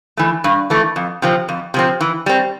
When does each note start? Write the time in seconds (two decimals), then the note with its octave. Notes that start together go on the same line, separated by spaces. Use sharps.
0.17 E3 A3
0.44 G2
0.70 E3 A3
0.96 F2
1.22 C3 F3 C4
1.49 F2
1.74 C3 F3 C4
2.01 E3
2.26 G3 C4